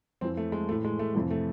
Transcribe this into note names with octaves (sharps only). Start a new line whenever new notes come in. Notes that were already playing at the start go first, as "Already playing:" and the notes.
F2 E3 C4
A3
G#3
A2 E3 A3
G#3
A3
F2 C3 E3 A3
A3